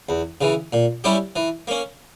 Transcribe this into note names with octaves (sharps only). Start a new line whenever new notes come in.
E2
C#3 E3
A#2
G3 C#4 E4 G4
E3
A#3 C#4